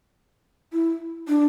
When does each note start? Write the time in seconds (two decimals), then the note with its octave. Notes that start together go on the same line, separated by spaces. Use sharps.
0.73 E4
1.28 D4